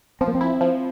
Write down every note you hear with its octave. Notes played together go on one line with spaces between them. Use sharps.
F3 C4
A#3
C4
E4
F3